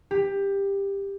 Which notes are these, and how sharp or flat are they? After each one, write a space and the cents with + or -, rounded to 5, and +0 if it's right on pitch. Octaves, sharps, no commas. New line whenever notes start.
G4 +15